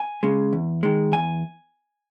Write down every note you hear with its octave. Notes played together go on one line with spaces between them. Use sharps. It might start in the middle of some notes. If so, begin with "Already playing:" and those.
Already playing: G#5
C#3 G#3
E2
D#3 G#3
E2 G#5